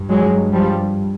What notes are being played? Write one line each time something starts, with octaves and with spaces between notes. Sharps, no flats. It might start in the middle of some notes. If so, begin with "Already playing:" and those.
Already playing: G2
F#3 G#3
F3 G3